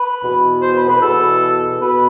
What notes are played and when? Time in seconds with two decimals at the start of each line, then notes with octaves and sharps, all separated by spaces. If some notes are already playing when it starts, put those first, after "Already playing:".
Already playing: B4
0.22 E2 B2
0.62 C5
0.75 B4
0.88 B4
1.01 E2 B2 A4
1.81 B2 B4